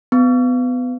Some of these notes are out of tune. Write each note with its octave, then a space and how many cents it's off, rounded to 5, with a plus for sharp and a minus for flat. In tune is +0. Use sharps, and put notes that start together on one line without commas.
B3 +25